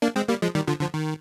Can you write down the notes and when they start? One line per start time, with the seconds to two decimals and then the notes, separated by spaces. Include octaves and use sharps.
0.02 A#3 D4
0.16 G#3 C4
0.28 G3 A#3
0.42 F3 G#3
0.55 D#3 G3
0.68 D3 F3
0.80 D3 F3
0.94 D#3